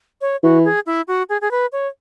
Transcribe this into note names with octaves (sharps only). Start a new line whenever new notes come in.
C#5
E3 F#4
G#4
E4
F#4
G#4
G#4
B4
C#5